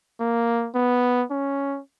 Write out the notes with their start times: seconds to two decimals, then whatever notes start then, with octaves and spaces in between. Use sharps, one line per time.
0.20 A#3
0.75 B3
1.31 C#4